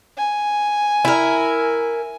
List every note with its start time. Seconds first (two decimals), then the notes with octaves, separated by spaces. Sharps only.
0.17 G#5
1.05 E4 A#4